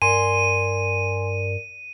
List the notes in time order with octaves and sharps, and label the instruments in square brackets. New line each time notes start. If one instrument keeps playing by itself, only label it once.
[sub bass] G2 [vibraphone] A#4 D5 [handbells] G#5 C6 [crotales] D#7